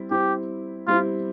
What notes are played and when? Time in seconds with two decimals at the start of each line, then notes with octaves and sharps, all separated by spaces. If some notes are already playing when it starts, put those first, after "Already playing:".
Already playing: G3 C4 E4
0.11 G3 C4 E4 G4
0.87 G3 C4 E4 F4